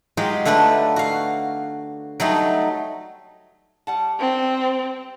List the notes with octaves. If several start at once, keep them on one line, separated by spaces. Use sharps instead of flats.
F#3 G#3 F4 G4
D3 A3 D4 G4 B4
F#4 F5
F#3 G3 A3 D#4
G3 F#5 A5
C4